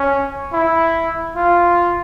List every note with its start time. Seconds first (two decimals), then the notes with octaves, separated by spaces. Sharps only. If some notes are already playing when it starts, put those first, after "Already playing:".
Already playing: C#4
0.53 E4
1.36 F4